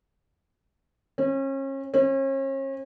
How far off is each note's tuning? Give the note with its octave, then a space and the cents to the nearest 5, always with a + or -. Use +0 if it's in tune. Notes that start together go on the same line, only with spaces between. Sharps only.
C#4 -35
C#4 -40